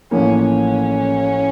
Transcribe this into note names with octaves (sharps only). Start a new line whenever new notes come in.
A1 A2 F3 A#3 C#4
C#4